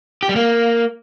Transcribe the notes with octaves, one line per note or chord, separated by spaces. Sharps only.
G4
G3
A#3